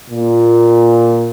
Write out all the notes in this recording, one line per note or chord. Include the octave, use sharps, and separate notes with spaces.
A#2